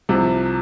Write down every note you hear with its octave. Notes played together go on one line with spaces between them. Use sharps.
C2 C3 F3